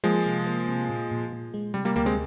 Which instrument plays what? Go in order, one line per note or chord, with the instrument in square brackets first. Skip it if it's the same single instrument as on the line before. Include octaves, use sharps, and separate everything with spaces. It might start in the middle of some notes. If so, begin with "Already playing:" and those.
[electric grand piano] F3 G#3 [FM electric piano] A#3
[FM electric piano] C3
A#3
C3
A#2
A#2
A#2
G#3
[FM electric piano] C3 [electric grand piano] G3
[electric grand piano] G3 A#3
[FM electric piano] D2 [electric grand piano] G3 A#3
[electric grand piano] G#3 C4